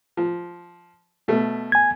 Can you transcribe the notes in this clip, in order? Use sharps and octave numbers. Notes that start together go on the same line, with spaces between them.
F3
B2 A3
G#5 G#6